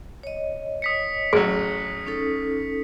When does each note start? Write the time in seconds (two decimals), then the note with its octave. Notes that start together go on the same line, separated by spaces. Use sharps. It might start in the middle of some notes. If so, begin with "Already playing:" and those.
0.23 C#5 D#5
0.82 D#6 B6 C#7
1.33 A1 F#3 G#4 B6
2.07 C#4 D#4 A4